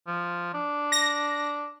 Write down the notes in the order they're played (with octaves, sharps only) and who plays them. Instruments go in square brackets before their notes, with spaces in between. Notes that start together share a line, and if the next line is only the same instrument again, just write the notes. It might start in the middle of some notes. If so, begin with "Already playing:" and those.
[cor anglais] F3
D4
[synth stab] A#6